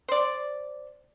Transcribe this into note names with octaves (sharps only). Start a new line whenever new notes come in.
C5 D5